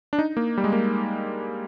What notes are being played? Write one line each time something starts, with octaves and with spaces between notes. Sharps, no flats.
D4
D#4
A#3
G3
G#3
A#3